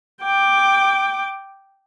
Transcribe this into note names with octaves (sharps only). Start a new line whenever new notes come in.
G5 D6